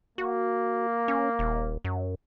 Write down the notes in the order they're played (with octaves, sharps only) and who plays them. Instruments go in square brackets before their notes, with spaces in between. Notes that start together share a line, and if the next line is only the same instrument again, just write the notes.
[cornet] A#3 [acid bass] F#4
[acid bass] C#4
D#1
F#2